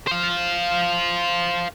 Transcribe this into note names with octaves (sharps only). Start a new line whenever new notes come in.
C5 F5